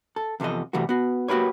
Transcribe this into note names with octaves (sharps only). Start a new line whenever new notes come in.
A4
E2 C3 F3 A4 D#5
C3 E3 G3 A3 F#4
B3 F#4
A#3 F#4 G4 B4 C#5